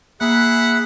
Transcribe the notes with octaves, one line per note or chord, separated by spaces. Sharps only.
A#3 G#4 E5 F#5 B5